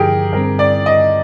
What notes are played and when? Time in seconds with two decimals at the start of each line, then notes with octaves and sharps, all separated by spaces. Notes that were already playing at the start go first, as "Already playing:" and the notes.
Already playing: G2 D3 F3 G4 G#4 A#4
0.33 G2 D3 G3 C4 A#4
0.59 D5
0.86 D#5